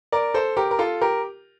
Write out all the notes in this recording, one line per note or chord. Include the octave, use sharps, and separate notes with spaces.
A#4 D5
A4 C5
G4 A#4
A#4
F4 A4
G4 A#4